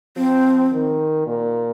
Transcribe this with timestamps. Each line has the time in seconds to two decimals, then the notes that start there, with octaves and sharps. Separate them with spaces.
0.17 F3 C4
0.73 D#3
1.27 A#2